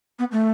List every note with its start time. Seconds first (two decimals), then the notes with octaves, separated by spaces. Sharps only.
0.19 B3
0.32 A3